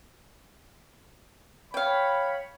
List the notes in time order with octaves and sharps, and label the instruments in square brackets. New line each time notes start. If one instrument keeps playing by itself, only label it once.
[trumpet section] C#5 B5 [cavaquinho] F5 G5